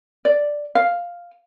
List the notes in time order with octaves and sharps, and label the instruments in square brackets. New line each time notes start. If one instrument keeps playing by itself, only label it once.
[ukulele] D5
F5